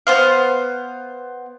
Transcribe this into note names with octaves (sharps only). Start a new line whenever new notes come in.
B3 C5 F5